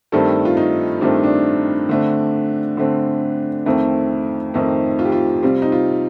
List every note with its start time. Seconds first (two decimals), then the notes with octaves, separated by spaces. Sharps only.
0.12 G2 D#3 A3 C4 A4
0.45 F4
0.57 D#4
1.01 G2 D#3 A3 C4 D4
1.24 D4
1.89 D3 A3 C4
2.77 D3 A3 C4
3.66 F2 D#3 A3 C4
4.54 F2 D#3 A3 C4 D#4
4.99 F4
5.05 G4
5.12 F4
5.43 C3 G3 C4 F4
5.62 D#4
5.72 F4